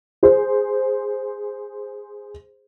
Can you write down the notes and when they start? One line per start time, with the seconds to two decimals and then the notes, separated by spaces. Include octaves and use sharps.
0.23 G#4 C5